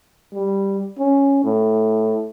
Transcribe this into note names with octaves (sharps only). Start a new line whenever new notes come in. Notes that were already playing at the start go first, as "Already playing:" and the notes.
G3
C#4
A2